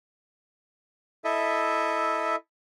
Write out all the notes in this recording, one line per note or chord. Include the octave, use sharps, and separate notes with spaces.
E4 A4 D#5 E5